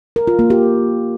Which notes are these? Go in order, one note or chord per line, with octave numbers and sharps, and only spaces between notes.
A#4
F4
A#3
G4